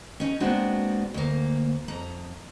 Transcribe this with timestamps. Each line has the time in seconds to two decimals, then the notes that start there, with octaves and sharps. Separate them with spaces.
0.20 C#4 D#4
0.40 A#2 G#3 B3 C4 D4 F#4
1.14 D2 A#3
1.88 F2 A#5